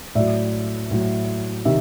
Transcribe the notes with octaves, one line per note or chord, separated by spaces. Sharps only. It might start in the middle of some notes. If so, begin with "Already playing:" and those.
A2 F#3 D5 E5
A2 F#3
C3 D#3 E5